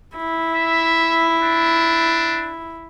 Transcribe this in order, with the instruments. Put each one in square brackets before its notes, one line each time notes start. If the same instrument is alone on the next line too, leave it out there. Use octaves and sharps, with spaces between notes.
[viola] E4
[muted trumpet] E5
D4